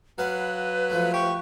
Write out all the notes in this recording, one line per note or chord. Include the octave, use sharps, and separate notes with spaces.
F#3 B4 F5 F#5
F3 A3
G4 C#6